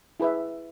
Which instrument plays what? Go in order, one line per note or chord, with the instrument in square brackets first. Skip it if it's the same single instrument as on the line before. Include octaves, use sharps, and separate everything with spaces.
[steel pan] E4 G#4 B4 E5